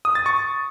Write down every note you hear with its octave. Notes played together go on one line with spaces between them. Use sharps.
D#6
A6
C#6